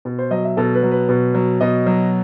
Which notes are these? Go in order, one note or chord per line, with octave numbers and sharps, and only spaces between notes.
B2
C5
F#3 D#5
E5
B2 A4
B4
F#3
B4
B2
F#3
B2 D#5
F#3